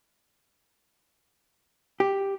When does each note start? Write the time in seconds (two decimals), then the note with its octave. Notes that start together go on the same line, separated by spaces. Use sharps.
2.00 G4